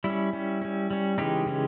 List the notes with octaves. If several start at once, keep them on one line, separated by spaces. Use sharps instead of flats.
G3 E4
C#4
G3 C#4
G3 C#4
G3 C#4
C#3 E3 G#3 C#4 D#4 G4
C#3 E3 G#3 C#4